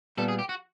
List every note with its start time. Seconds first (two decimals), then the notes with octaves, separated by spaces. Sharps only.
0.18 A#2 G3 B3 A4
0.28 G#4
0.39 G4
0.49 F#4